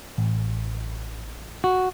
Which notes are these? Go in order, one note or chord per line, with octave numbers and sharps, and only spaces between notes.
A1
F#4